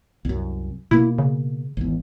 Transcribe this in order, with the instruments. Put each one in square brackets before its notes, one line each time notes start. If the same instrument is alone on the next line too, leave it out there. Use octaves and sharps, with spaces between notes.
[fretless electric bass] C2 F#2
[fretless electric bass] B2 A#3 [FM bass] E4
[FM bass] C#3
[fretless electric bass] G#1 E2